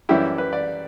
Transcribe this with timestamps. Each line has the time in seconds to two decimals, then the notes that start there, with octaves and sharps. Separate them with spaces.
0.09 F#2 E3 G3 C#4 E4 G4
0.38 B4
0.53 D5